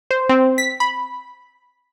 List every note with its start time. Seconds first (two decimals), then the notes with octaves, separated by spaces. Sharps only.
0.11 C5
0.29 C4
0.58 B6
0.80 B5